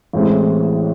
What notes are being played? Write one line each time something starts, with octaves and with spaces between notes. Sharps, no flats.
A1 A2 E3 G#3 C4